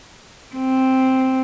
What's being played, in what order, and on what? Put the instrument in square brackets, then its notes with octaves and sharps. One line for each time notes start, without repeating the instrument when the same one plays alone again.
[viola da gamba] C4